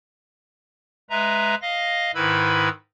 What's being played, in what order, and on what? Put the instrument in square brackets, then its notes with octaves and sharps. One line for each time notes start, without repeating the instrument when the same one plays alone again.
[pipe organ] G#3 B4 E5 A#5
D#5 F5 A#6
G#2 D#3 E4 B4 B5 E6